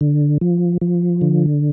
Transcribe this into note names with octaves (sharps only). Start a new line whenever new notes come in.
D3
F3
F3
D3